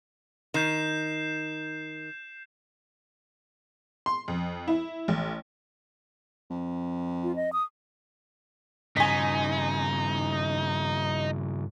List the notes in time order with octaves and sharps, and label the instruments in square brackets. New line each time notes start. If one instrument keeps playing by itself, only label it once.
[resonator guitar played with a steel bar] D#3 [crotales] G6 C7 E7
[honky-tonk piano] C6
F2
E4
A1
[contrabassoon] F2
[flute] F4
D#5
D#6
[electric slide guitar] G2 C#3 [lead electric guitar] D#4 [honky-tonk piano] G#5 B6